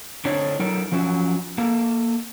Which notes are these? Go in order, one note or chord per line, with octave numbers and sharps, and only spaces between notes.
D3 A3 C4 D4 D#4 C#5
F#3 D#4 A4 A#4
F3 F#3 C#4 F#4
A#3 A4